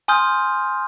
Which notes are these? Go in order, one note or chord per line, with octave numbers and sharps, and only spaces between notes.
G#5 C6 D#6 F6 G6